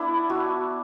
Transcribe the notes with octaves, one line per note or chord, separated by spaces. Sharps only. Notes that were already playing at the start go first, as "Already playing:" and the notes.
Already playing: B3 D4 E4
F#4